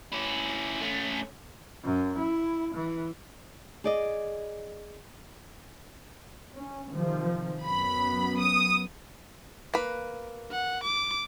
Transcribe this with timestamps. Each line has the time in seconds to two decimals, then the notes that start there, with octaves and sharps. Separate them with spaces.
0.12 C#4 E4
0.81 A3 C#4
1.84 F#2
2.18 E4
2.75 E3
3.84 G#4 D5 D#5
6.54 C#4
6.90 C3 D#3 F3
7.63 F#2 B3 B5
8.40 D#6
9.74 A#3 B4
10.52 F#5
10.84 D6